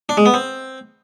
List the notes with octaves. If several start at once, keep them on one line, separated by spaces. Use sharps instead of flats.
D4
G#3
B3
C4